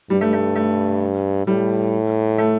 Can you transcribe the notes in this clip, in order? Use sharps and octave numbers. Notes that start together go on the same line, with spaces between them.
G2 G3
A3
A3
A3
A2 G3
A3